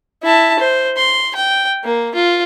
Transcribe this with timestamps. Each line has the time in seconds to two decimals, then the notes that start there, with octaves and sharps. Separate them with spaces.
0.23 E4 A5
0.59 C5
0.96 C6
1.35 G5
1.84 A#3
2.15 F4